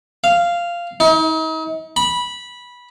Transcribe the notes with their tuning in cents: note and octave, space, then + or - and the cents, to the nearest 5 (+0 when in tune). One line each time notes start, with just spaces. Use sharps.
F5 -10
D#4 +40
B5 -15